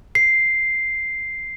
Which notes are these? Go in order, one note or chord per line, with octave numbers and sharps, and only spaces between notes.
C7